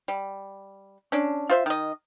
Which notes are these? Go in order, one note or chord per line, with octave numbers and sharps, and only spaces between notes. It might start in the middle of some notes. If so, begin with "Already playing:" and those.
G3
C#4 D4
F4 C5 E5
D#3 D#5